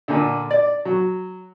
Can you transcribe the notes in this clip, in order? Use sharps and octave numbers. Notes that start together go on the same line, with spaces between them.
A#2 D3
D5
F#3